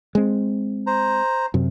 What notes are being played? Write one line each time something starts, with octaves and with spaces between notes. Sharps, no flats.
G#3 C4
C5 A#5
F#2 C3